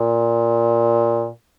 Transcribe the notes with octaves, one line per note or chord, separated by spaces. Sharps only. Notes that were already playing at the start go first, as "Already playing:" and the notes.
Already playing: A#2